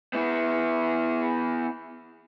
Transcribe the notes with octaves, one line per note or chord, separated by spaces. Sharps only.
B3 E4